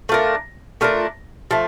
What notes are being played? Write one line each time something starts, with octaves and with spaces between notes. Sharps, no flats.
A3 D4 F4 A#4
A3 D4 F4 A#4
F3 A3